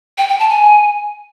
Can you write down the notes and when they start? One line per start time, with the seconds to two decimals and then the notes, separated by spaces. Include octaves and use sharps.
0.18 G5
0.29 G5
0.39 A5
0.50 G#5